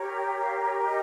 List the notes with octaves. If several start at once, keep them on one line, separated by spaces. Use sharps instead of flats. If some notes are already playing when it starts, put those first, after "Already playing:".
Already playing: G4 A#4 C#5
G5
F5
C#5
C#5
D#5